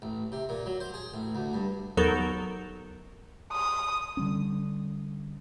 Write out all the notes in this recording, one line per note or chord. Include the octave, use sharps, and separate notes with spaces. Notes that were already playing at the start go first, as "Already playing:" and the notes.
A1
C3
A#2
F#3
C5
G#4
A1
D2
G2
D#2 F#3 B3 A4 A#4 G6
D#6
D3 G3 C#4